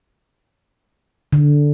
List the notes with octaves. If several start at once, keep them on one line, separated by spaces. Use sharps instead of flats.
D3